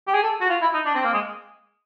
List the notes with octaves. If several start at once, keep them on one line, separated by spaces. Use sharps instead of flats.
G4
G#4
A4
F#4
F4
E4
D#4
D4
C4
A#3
G#3